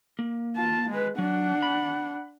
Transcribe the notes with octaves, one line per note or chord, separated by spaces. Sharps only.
A#3
F4 A5
G#3 B4
F#3 D4 F#5
B5